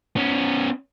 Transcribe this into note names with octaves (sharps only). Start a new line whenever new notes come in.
B3 C#4